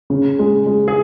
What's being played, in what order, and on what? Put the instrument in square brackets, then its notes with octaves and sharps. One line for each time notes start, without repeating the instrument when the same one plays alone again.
[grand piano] C#3
G#3
G#3
[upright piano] G#4